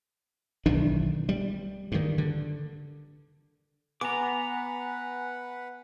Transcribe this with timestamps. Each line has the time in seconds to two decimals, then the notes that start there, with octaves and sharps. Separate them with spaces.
0.66 B1 D#3 E3 D4
1.29 G3
1.92 G2 D#3
2.18 D3
4.01 B3 B4 F#5 G#5 A#5 D6